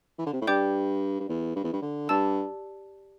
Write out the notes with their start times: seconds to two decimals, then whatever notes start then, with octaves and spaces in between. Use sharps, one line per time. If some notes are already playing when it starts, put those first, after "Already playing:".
0.18 E3
0.26 D3
0.33 C3
0.41 A2
0.47 G2 G4 D5 G5 D6 G6
1.20 G2
1.29 E2
1.55 G2
1.64 E2
1.73 G2
1.82 D3
2.09 G2 G4 D5 A5 E6